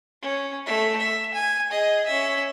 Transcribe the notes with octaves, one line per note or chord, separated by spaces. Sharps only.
C#4
A3 E5
E5
G#5
G#4 D#5
C#4 E5